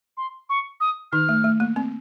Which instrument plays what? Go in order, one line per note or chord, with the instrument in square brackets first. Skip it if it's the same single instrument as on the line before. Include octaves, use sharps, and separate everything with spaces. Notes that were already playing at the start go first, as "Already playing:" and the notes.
[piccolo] C6
C#6
D#6
[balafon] D#3 D#4 [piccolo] F6
[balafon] A3
A3
A#3
C4